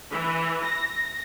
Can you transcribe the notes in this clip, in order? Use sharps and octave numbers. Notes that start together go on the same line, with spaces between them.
E3
A#6